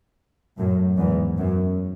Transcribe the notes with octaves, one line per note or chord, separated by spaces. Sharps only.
F#2 A2
E2 G#2
F#2